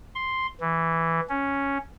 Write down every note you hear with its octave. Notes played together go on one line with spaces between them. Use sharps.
C6
E3
C#4